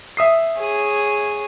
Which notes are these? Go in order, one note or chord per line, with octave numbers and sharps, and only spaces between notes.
E5 D#6 C7
G#4 C#5